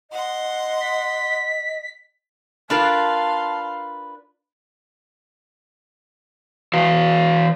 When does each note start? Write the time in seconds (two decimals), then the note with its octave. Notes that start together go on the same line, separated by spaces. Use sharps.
0.11 D#5 F#5 C6
0.81 B6
2.70 D4 F4 A#4 B4 F5 A5 C6
6.74 E3 F#4 F5